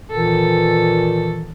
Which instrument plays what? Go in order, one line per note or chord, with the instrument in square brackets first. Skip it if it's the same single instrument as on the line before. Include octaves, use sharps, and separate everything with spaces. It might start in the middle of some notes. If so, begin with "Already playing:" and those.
[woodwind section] A#2 D#3 E3 [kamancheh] A4